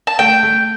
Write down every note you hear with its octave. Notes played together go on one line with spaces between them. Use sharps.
A5
A3 G5
A3